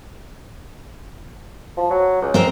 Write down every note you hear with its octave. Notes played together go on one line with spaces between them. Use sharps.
F3
F#3
C#2
C4 A#4 C5